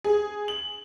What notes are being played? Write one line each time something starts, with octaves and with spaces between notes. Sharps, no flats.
G#4
F#7